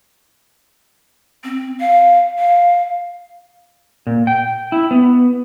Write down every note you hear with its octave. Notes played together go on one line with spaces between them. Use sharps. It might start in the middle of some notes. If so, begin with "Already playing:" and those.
C4
F5
F5
A#2
G5
E4
B3